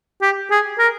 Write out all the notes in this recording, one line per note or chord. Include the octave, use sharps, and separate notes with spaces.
G4
G#4
A#4